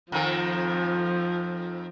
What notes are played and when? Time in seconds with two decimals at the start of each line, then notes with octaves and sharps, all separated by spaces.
0.12 F2 D#3 F3